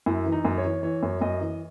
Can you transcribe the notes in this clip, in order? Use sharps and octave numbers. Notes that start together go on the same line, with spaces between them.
F#2 E4
E3
D#4
F#2
C#5
E3
E3 C#5
F#2
F#2 D#5
E3